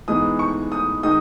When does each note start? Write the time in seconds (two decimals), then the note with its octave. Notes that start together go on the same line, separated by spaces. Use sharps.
0.08 G#2 E3 G#3 B3 D#4 D#6
0.39 C#6
0.72 D#6
1.03 D#3 G#3 D#4 D#6